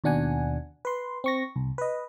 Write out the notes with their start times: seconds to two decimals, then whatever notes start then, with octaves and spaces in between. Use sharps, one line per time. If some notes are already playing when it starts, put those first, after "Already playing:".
0.04 D#2 B2 D4 F#5 G#5
0.85 B4 C6
1.24 C4 C#6 A#6
1.56 C2
1.78 B4 D#5